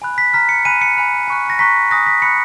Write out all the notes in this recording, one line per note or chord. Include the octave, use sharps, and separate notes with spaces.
G#5 B5 F#6
B6
A#5 F6 B6
C#7
G#5 B5 F#6 D#7
C#7
G#5 B5 F#6
G#5 C#6 F#6
A#6
A#5 C#6 F#6 B6
G#5 D#6 F#6 A#6
B6
B5 F#6 C#7